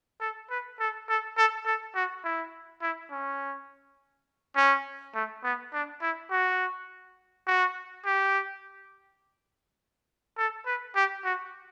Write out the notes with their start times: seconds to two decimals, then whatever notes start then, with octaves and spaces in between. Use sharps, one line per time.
0.21 A4
0.50 B4
0.80 A4
1.09 A4
1.38 A4
1.66 A4
1.95 F#4
2.24 E4
2.82 E4
3.11 C#4
4.57 C#4
5.15 A3
5.44 B3
5.73 D4
6.02 E4
6.31 F#4
7.47 F#4
8.06 G4
10.38 A4
10.66 B4
10.96 G4
11.25 F#4